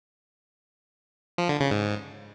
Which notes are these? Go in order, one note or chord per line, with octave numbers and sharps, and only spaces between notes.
F3
D3
C#3
G#2